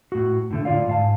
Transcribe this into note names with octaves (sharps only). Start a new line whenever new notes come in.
A2 F#4
A2 D3 A3
A2 D3 F4 D5 F5
G#2 F5 A5